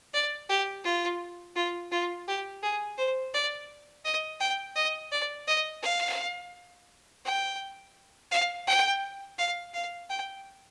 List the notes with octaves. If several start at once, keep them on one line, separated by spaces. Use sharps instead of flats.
D5
G4
F4
F4
F4
G4
G#4
C5
D5
D#5
G5
D#5
D5
D#5
F5
G5
F5
G5
F5
F5
G5